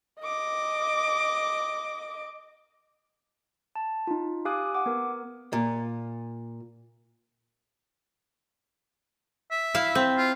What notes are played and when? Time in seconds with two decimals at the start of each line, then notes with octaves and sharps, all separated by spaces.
0.21 D#5 D6
3.75 A5
4.07 D#4 F4
4.45 G4 F5 G#5 D6 D#6 F#6
4.74 F#5 D6
4.86 B3 A#4
5.53 A#2
9.51 E5
9.74 E4 F5
9.95 C4
10.18 F4